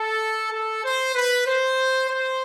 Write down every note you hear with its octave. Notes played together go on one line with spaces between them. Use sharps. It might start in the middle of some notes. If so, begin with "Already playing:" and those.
Already playing: A4
A4
C5
B4
C5
C5